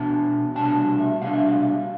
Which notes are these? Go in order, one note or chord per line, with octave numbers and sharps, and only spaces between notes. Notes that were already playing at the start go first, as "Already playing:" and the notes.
Already playing: B2 B3 D4 A5
C2 B2 G3 D4 A5
E5
C2 B2 G3 D4 F5
E5
F5